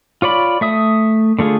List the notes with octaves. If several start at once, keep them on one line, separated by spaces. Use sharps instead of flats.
F4 C#5 D5 B5
A3 E5 D#6
D3 A3 F4 G#4